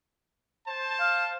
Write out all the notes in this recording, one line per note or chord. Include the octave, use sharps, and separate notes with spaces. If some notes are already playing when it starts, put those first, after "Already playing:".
C5 A5
F5